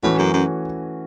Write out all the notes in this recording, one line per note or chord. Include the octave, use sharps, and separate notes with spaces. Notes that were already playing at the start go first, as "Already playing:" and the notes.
A2 E3 A3 C#4 F#4
F#2
F#2